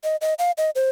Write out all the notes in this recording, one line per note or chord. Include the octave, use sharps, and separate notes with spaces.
D#5
D#5
F5
D#5
C5